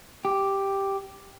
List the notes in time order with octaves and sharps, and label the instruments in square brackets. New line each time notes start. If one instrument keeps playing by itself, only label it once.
[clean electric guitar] G4